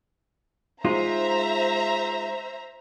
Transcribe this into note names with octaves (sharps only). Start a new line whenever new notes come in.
G#3 D#4 F4 C5 E5 A#5